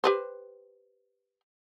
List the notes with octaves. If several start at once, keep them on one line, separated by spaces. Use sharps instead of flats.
G4 B4 C5